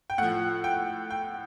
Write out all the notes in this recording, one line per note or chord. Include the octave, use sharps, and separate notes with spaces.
G5
A2 F3 F#5
G5
G5